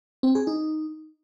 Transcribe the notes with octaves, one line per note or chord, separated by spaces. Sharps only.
C4
G#4
D#4